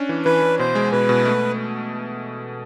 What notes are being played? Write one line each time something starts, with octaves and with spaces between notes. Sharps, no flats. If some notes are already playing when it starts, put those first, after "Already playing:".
Already playing: C#4 D4
E3
E3 B4
E3
B2 C5
G#3
B2 B4
B2
A3